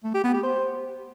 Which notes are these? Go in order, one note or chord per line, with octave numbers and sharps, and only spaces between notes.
A3
G4
B3
G4
C5